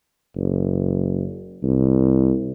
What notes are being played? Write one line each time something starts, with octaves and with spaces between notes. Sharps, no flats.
F#1
C2